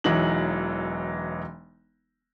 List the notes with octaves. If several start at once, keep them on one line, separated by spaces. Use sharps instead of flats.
E1 E3 F#3 D#4 F#7